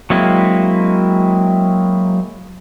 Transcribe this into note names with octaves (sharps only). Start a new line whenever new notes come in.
F#3 G#3 A#3 C4 E4